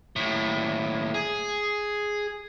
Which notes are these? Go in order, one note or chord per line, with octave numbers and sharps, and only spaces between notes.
D#2 A2
G#4